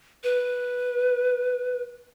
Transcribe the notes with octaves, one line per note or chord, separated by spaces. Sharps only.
B4